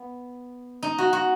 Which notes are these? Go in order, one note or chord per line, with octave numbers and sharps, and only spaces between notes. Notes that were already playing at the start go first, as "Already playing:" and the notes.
Already playing: B3
D#4
F#4
F#4